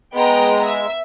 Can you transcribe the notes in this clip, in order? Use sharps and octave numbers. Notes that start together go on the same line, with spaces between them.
G#3 B3 G5 A#5
E5